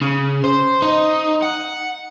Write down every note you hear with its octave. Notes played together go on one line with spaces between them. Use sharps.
C#3
C5
D#4
F#5